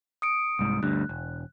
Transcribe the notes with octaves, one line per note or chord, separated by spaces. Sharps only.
D#6 C#7 D7
C2 G#2
D2 G2 F#6
E1